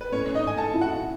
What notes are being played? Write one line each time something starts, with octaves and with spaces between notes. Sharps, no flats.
B4
A2 C#4 C#5
D#4 D#5
A2 G#5
A4 A5
E4
F#4 F#5